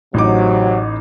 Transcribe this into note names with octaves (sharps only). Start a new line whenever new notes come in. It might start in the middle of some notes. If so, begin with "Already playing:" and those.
A1 C3 F#3 D#4 D6